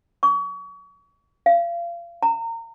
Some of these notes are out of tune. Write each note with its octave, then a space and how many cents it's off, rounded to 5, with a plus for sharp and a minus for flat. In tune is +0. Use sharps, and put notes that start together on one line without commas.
C#6 +35
F5 -30
A#5 -30